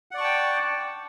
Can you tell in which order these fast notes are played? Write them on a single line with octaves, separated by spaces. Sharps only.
F#5 D5 C#6 A5 G5